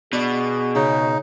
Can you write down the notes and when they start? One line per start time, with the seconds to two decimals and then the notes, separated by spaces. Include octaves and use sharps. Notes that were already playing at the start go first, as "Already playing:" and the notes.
0.13 B2 D4 G#4
0.75 C#3 D#4